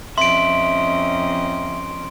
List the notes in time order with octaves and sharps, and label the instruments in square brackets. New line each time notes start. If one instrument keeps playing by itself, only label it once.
[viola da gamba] F2 C#4 D#5 [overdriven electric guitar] E5 [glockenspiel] C6 D7